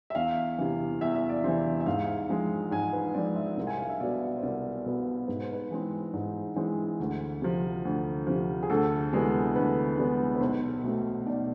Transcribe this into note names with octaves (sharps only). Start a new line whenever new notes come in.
E5
E2 F5
C3 E3
E2 E5
E5
D5
C3 E3 C5
E5
G#2 F5
F3 G#3 C4
G#2 G#5
B4
F3 G#3 C4 D5
E5
C2
G#5
F5
E5
B2 B3 D5
C5
C2 D5
B2 B3
G#2 B4
C5
B4
E3 G#3 C4
G#2
E3 G#3 C4
D2
C3 F3
D2
C3 F3
G#4
D2 A4
C3 E3 G#3 B3
D2 B4
C3 E3 G#3 B3
B4
B1 C5
B2 A3 C4
B1 D5